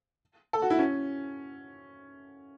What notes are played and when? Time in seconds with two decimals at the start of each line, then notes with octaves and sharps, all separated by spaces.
0.53 A4
0.62 F#4
0.70 E4
0.79 C#4